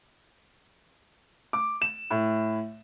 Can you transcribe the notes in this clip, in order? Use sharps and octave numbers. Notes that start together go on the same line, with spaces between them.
D6
E7
A2